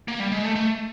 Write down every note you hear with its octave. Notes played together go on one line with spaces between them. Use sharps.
A#3
G3
G#3
A3
A3